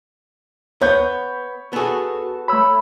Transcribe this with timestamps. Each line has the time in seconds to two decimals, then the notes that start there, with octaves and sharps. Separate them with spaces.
0.81 B3 C#5 G6
1.73 B3 F#4 G#4 A4 A5
2.48 A3 C#5 B5 E6